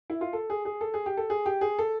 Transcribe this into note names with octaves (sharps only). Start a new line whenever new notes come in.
E4
F4
A4
G#4
G#4
A4
G#4
G4
A4
G#4
G4
G#4
A4